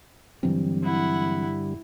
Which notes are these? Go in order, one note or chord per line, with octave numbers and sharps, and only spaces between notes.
G2 D3 E3 F#3 G3 C4
E4 F#5